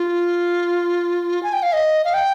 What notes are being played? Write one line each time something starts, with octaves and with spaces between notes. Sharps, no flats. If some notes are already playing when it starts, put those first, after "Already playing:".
Already playing: F4
G#5
G5
F5
D#5
F5
G5